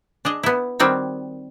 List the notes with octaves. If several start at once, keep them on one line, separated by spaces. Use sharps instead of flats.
D4 G#4 D#5
B3 E4
D#3 G3 C4 F#4 C#5